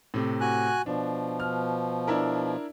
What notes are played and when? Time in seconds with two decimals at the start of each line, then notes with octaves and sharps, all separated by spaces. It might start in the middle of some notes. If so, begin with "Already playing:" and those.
0.14 A2 C3
0.41 F#4 G#5 F#6
0.86 B2 F3 D4
1.40 F6
2.08 D4 E4 A#4